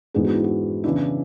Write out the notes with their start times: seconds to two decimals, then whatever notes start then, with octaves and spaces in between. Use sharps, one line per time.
0.14 G#2 E3 B3 D4 G#4
0.24 F#4
0.34 E4
0.44 F#4
0.84 C#3 E3 B3 D4 E4